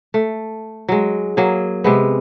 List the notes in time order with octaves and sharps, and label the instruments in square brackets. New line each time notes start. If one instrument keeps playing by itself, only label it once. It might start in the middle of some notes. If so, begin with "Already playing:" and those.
[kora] A3
F#3 G#3
F#3 A#3 G#4
C3 G#3 B3